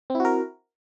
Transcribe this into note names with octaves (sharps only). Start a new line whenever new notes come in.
C4 E4 F#4 A#4